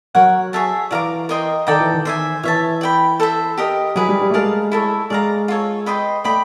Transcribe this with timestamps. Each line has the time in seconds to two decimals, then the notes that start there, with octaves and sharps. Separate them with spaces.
0.15 F#3 A#4 C#5 F#5
0.53 G#4 C#5 E5 A5
0.91 E3 D5 F5 A#5 D6
1.29 A#4 D#5 G5 C6
1.67 D#3 A4 D5 G5 A#5
1.80 E3
1.93 D#3
2.05 C5 E5 G#5
2.43 E3 C#5 E5 A5
2.81 D5 G5 B5
3.20 A4 C5 E5
3.58 G4 A#4 D#5
3.95 F#3 E4 G#4 B4
4.09 G3
4.21 G3
4.30 A3
4.34 G#3 A#4 D5 F5 A5
4.72 E4 A4 C#5
5.10 G#3 D5 F5 A#5
5.48 F4 A4 C#5
5.86 B4 D#5 G5 C6
6.24 A3 D5 G5 B5 D#6